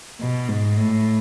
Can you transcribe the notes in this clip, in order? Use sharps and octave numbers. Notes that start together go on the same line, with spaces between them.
B2
G#2
A2